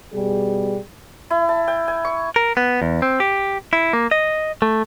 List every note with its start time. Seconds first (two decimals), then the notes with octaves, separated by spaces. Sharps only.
0.13 B2 G3 G#4
1.30 E4
1.49 A5
1.68 G5
1.88 G#5
2.05 C#6
2.36 A#4
2.57 B3
2.82 E2
3.02 C4
3.20 G4
3.73 E4
3.93 A#3
4.11 D#5
4.62 A3